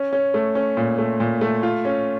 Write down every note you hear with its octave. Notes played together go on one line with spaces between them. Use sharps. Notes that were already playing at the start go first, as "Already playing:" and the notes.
Already playing: C#4
C#4
A3
C#4
A#2
A3
A#2
A3
F4
C#4